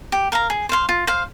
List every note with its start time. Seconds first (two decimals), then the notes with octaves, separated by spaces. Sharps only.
0.12 G4
0.32 A#4 F5 A#5
0.50 G#4
0.69 C5 F5 C6
0.89 F4
1.07 C5 F5